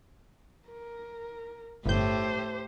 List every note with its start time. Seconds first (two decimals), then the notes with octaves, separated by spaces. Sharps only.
0.68 A#4
1.86 G1 A2 G4 C5 G6